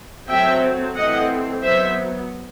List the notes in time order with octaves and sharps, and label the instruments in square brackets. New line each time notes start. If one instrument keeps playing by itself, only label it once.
[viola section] F#3 A3 C4 E5 G5
E3 A3 C4 D#5 F#5
F#3 B3 C5 E5